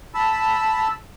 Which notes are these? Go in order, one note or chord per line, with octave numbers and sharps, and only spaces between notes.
A5 B5 E6